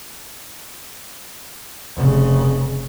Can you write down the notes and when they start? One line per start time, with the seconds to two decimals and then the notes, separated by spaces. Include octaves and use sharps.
1.97 F1 C#3